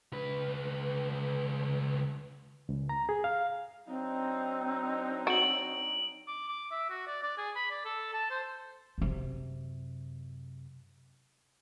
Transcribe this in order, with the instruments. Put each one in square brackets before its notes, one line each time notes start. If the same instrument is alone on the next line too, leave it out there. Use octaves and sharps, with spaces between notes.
[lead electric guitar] C#2 B4
[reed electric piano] C#2
A#5
G#4
F5
[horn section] F#3 D4 D#4 [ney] C4
[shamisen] F#4 [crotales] D7 F#7
[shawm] D6
D6
E5
F#4
D5
D5
G#4
B5
D5
A4
A5
C5
[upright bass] F#2 C3